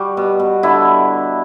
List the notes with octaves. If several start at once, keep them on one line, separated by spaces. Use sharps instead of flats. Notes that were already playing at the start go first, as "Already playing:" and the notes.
Already playing: G3 F#4
B2
B2
D3 E4